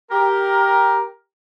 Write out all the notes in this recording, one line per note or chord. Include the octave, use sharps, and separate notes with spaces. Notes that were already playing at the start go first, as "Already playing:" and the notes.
G4 A#4